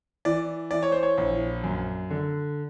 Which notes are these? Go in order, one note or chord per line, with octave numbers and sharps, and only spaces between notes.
E3 D5
E3 D5
C#5
C5
C#5
A#1
F#2
D3